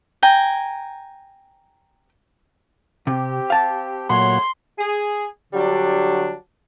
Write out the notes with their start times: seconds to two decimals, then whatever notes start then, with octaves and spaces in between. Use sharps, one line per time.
0.23 G5 G#5 A#5
3.07 C3 C4 G4
3.50 F5 A5
4.10 A#2 F#3 A3 C#5 F#5 C6
4.79 G#4
5.53 D3 F#3 G3 D4